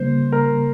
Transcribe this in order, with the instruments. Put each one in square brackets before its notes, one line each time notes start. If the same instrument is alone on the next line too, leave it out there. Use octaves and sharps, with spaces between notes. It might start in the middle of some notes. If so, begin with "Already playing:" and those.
Already playing: [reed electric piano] C#3 G3 A#3 [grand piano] C5
[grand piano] A#4